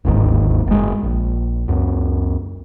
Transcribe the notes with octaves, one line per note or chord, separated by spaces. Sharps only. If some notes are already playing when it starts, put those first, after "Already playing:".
D1 G1 D#2 G#2
F#1 G#3
A#1
C#2 F#2